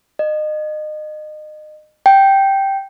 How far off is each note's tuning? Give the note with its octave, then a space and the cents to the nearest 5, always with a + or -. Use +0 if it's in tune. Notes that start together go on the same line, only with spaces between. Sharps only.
D#5 -30
G5 -5